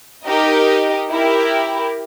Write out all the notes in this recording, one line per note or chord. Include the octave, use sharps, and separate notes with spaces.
D#4 G4 A#4 D#5
E4 G4 A#4